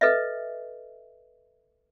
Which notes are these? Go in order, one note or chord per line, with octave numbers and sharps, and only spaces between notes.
A4 B4 D#5 E5